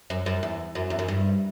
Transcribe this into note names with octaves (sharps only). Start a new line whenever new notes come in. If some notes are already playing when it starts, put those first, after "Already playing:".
F#2
F#2
E2
F#2
E2
F#2
G2